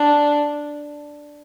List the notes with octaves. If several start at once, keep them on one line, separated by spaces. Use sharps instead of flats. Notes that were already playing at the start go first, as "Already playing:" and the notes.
Already playing: D4